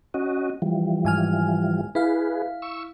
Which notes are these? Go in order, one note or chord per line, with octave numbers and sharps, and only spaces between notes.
C#4 F#4 D#5
E3 F3 G3
G#2 G#5 F6
E4 G#4 B4 F5
C#6 E6